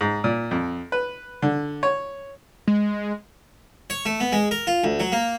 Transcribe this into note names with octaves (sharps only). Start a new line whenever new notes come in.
G#2
A#2
F2
B4
D3
C#5
G#3
C#5
A3
B3
G#3
A#4
F4
D2
F#3
A#3